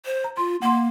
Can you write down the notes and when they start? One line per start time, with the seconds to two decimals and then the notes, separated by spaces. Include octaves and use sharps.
0.05 C5
0.24 A#5
0.37 F4 C6
0.62 A#3 F#5 C6